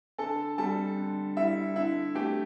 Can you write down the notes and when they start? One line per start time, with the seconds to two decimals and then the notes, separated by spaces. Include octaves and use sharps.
0.18 D3 A4 A5
0.58 G3 A4 A5
0.97 D3
1.36 G3 E4 E5
1.76 D3 E4 E5
2.15 A3 G4 G5